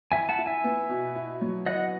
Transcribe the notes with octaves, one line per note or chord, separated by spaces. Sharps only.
E4 E5 G#5
F#5 A5
E4
E5 G#5
B3
B2
E4
F#3
E4 D#5 F#5